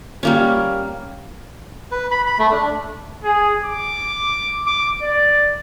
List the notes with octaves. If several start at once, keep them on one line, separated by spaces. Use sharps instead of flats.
G3 A#3 C#4
B4
B5
B5
A3
D4
G#4
D6
D6
D5